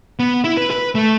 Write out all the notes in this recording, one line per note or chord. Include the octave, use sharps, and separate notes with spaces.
B3
E4
B4
B4
A3